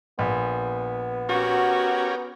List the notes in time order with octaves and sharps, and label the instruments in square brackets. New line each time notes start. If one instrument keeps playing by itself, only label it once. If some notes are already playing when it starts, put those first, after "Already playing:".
[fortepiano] A#1 [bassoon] B3
[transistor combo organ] C#4 G4 A#4 [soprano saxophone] F#4